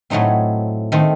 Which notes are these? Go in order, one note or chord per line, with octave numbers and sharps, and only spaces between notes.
A2 F#3 A3 C4 D#4
D#3 A3 C4